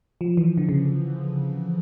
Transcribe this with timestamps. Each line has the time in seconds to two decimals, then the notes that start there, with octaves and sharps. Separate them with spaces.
0.21 F3
0.37 E3
0.58 D3
0.69 C#3